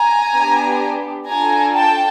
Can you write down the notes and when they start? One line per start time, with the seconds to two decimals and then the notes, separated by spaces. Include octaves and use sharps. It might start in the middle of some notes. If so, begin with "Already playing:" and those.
Already playing: G#5 A#5
0.33 B3 D4 G4
1.29 D4 F4 A4 G#5 A#5
1.77 G5 A5